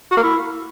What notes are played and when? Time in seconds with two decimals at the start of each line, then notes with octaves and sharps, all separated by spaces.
0.12 F#4
0.17 A#3
0.23 E4